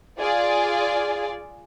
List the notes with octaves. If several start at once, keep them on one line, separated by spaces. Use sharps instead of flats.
F4 G#4 D5